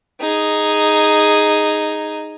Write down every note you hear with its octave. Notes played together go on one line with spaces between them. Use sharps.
D#4 G#4